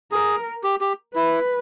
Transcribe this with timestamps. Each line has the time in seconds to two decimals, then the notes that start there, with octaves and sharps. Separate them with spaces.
0.12 G#4 A#4
0.64 G4
0.81 G4
1.15 E4 B4